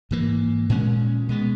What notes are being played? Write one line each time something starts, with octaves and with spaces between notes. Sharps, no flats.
G#2 E3 A#3
A#2 G#3 C#4
B2 G#3 B3